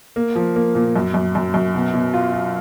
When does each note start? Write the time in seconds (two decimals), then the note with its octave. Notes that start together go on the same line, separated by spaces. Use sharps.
0.16 A#3
0.36 F3
0.56 A#3
0.75 A#2
0.96 F#2
1.14 F#2
1.35 F#2
1.54 F#2
1.74 B2
1.94 B2
2.13 F4
2.33 F4